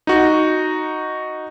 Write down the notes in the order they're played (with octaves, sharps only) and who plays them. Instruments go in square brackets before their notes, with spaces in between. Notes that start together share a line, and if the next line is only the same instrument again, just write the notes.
[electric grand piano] D#4 F#4